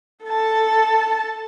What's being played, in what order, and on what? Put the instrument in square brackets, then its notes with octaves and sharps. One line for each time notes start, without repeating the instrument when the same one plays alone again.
[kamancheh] A4 A5